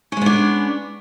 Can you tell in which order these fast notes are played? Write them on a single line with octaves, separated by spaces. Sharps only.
C#4 G#3 B3 D4